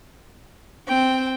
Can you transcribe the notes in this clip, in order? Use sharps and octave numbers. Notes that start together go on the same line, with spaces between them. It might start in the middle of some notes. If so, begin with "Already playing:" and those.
C4 G5